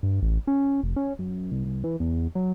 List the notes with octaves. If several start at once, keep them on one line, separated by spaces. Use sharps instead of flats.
G2
A1
C#4
F1
C#4
F#2
C2
C2
E3
E2
F#3